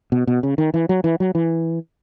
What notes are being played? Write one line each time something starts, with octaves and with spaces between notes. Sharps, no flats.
B2
B2
C#3
D#3
E3
F#3
E3
F#3
E3